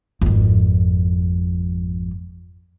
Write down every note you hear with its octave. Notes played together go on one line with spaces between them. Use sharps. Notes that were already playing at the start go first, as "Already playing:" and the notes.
G#1 F2